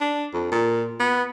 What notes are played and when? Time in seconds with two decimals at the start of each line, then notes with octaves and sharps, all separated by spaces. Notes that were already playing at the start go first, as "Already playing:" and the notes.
0.01 D4
0.33 F2
0.52 A#2
1.00 B3